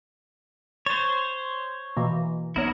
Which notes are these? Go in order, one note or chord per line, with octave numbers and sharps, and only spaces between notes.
C5 C#5 A6
B2 E3 A#3
B1 B3 E4 A#4 C#5